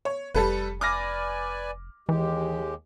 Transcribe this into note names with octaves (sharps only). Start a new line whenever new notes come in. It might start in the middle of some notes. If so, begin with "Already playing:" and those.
C#5
F1 G3 A4 B4
B4 D5 G#5 D6 F6 A#6
D#2 E3 G#3 G4